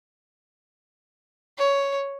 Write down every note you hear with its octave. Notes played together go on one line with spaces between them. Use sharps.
C#5